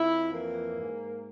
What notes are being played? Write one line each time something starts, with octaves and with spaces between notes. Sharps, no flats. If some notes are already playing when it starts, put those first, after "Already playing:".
Already playing: F2 E4
E3 A#3
G#2